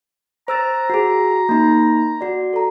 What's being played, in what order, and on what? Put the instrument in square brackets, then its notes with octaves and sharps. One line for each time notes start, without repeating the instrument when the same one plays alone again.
[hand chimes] C5 E6 A6 [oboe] A#5
[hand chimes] F#4 G#4
A#3 D#4
F#4 D5
A4 A#5